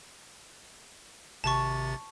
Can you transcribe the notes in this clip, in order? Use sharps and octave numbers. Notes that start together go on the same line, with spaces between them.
G#1 C3 A5 C#6 A6